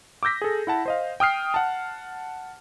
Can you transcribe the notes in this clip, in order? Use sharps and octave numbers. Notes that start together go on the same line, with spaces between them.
D6 E6 G6 A#6 B6
G#4 A4
E4 F#5 A5
C5 D#5 F5
G5 D#6 F6 C7
F#5 A5